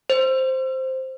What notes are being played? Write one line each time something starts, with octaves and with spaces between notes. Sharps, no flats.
C5